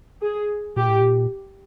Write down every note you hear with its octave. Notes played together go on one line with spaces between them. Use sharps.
G#4
A#2 G4
A2
A#2